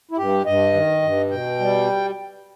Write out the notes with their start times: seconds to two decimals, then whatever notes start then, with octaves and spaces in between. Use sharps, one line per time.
0.11 E4
0.17 G2 G4
0.46 G2 D#5
0.73 D#3
1.02 G2
1.30 B2 G5
1.59 G3